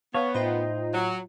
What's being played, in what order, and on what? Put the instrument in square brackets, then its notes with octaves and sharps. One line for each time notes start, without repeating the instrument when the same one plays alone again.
[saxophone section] B3 [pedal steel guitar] C#5 [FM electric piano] F5 A5
[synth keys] A2 F4 G5 [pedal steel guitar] D#4 [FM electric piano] C5
[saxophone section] F#3